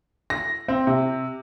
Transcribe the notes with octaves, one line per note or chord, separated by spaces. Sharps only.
A#6
C4
C3